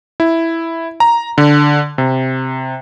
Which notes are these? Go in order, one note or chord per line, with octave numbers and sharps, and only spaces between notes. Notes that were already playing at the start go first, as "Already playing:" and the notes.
E4
A#5
D3
C3